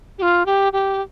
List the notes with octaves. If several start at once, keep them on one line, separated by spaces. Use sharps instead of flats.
G4
F4
G4
G4